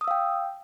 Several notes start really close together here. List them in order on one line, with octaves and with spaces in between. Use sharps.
D#6 E6 F5 G5